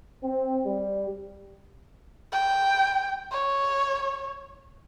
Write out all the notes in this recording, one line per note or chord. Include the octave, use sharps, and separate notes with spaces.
C4
G3
G5
C#5